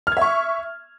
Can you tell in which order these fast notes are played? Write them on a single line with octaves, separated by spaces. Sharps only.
F6 G#6 E5 C#6